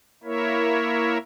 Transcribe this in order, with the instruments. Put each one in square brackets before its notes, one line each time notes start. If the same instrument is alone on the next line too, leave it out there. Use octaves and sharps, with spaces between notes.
[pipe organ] A#3 E4 A#4 C#5 E5